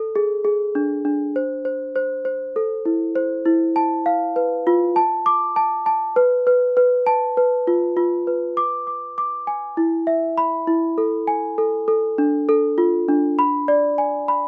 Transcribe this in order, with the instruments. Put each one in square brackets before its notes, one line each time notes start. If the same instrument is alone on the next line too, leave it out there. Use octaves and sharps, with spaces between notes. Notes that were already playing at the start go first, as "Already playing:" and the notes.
Already playing: [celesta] A4
G#4
G#4
D4
D4
C5
C5
C5
C5
A4
E4
C5
E4
A5
F5
B4
F4
A5
D6
A5
A5
B4
B4
B4
A5
B4
F4
F4
B4
D6
D6
D6
G#5
E4
E5
B5
E4
A4
G#5
A4
A4
D4
A4
F4
D4
B5
D5
G#5
B5